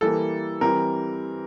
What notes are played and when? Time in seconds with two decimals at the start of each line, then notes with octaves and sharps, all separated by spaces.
0.01 E3 G3 A#3 A4
0.61 E3 G3 C4 A#4